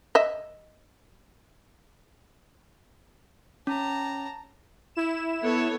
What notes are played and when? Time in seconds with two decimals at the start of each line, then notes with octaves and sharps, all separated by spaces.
0.15 D#5 E5
3.67 C#4 A5 A#5
4.95 E4 E7
5.42 B3 A4 C#5